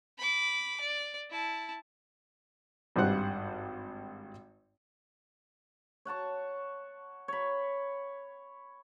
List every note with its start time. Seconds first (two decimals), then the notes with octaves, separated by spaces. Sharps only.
0.18 B5 D6
0.81 D5
1.31 E4 A5
2.96 G#1 G2 G3 C5 F#5 F#6
6.05 C#5 F#5 A5 C#6
7.28 C#5 B5